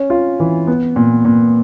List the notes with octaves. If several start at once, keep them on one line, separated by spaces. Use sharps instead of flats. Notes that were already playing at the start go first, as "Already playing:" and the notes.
Already playing: C#4
F4
E3
B3
A#2
A#2